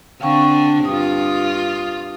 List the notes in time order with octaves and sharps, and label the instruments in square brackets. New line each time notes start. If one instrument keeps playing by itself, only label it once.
[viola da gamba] D3 C4 D4 [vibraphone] F5 G5 C#6
[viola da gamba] G2 F4 [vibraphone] D#6